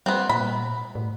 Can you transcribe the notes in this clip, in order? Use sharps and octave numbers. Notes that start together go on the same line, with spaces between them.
G3 B3 C4
A#2 B5
A2